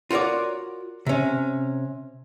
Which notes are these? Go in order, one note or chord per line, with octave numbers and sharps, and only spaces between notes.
F4 F#4 A#4 C#5 D5
C3 C#4